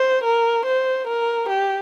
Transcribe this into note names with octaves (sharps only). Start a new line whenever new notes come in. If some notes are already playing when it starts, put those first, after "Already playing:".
Already playing: C5
A#4
C5
A#4
G4